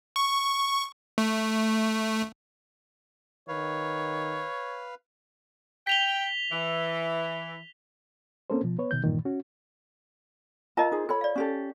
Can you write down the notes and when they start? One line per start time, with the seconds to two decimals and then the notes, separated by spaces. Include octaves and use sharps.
0.16 C#6
1.18 A3
3.48 D#3 B4 C#5 F5
5.87 G5 B6 F7 G7
6.51 E3
8.50 A#3 C4 C#4 A4 A#4 C5
8.63 B2 F3
8.78 B3 B4 C#5
8.91 B2 D#3 G6
9.03 G2 A#2 D#3 E3
9.25 C#4 F#4
10.77 F4 A#4 D#5 F5 A5
10.91 D#4 G#4 C5
11.09 A4 C#5 B5
11.21 D5 F5
11.36 C#4 G4 A4